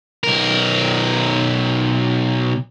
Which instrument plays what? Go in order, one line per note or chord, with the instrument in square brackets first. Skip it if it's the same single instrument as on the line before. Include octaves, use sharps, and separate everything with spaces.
[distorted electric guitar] B1 A#4